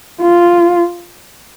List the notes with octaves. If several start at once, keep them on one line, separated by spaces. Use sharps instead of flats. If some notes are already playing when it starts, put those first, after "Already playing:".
F4